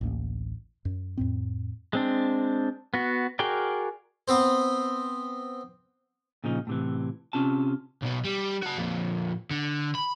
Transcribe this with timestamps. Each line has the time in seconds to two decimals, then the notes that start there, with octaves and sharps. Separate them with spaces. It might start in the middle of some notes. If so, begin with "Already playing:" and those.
0.01 A1 D2 A#3
0.85 F#2
1.17 F2 A2 C4
1.93 G#3 C4 D4
2.94 B3 F#4
3.39 F#4 G#4 A#4 D5 G5
4.28 B3 C4 C5
6.44 A#2 C#3 F3 D#4
6.67 A2 C3 E3
7.33 C3 C#4 F4 A5
8.03 B1 B2
8.25 G3
8.62 F#4 A5
8.78 F2 A#2
9.51 D3
9.95 B5